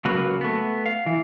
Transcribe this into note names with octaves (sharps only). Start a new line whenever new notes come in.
C#2 C#3 F#3 A#3 F#4 B4
A3 B3
F5
E3